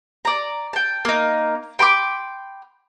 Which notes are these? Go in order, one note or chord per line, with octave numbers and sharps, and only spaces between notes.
D5 A#5
G5 A5
A#3 D#4
G5 B5 C6 D6